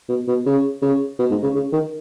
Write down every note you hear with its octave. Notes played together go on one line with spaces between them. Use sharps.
B2
B2
C#3
C#3
B2
G#2
C#3
C#3
D#3